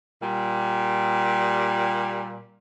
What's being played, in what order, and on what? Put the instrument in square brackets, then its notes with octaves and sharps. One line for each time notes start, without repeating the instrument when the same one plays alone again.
[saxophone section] A#2 G3